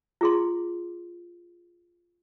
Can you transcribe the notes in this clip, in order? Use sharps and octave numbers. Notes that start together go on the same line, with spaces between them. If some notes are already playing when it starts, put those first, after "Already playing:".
F4 G#4 C6